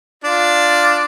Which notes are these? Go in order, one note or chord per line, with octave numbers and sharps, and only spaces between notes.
D4 F4 D5